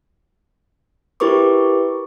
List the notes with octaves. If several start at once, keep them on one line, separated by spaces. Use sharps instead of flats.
E4 G4 A#4 B4 C#6 D6